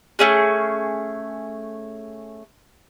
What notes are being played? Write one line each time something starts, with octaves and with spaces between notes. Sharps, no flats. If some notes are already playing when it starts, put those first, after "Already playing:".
A3 C#4 G#4